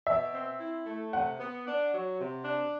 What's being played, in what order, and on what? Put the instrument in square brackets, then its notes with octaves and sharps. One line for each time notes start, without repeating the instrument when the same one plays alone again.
[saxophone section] B2 [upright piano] E5
[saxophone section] C4
E4
A3
[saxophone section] C3 [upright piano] F#5
[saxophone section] B3
D4
F#3
C3
D4